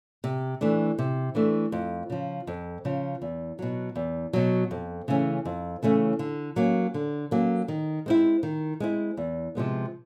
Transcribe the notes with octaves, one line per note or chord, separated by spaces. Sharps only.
C3
E3 A3 D4
C3
E3 A3 D4
F2
C#3 F3
F2
C#3 F3
E2
B2 F#3
E2
B2 F#3
F2
C#3 E3 A3 C#4
F2
C#3 E3 A3 C#4
D3
F#3 A#3 C#4
D3
F#3 A#3 C#4
D#3
G#3 C4 E4
D#3
G#3 C4 E4
E2
C3 F3 G#3 B3